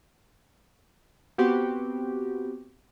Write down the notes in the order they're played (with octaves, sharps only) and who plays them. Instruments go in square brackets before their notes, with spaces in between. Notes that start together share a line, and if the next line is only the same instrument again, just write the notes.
[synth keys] B3 C4 F#4 G4